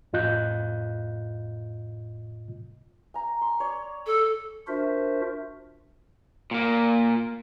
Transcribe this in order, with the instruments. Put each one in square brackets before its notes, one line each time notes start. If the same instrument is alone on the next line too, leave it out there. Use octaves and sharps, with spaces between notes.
[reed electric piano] F2 A2 F4 D#5 F#6 G6
[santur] G#5 A#5
C6
C#5 D5
[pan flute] A4
[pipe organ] D4 F4 F#4 A#4 C5 E5
[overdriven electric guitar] A#2 A#3